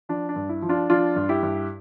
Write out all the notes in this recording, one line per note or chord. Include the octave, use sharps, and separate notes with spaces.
F3 D4
D4
G2
E4
F3
D4 F4
F3 D4 F4
G2
E4 G4
G2